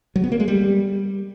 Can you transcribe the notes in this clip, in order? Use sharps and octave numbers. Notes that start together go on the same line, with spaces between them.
F#3
B3
A#3
G#3
G3